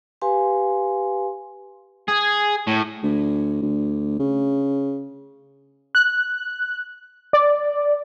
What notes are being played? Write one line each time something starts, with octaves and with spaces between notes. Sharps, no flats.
G4 B4 F5 G#5 C6
G#4
A2
D2
D2
C#3
F#6
D5